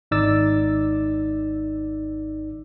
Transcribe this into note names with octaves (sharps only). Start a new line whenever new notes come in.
G#1 D#4 D5 D6 E6 A6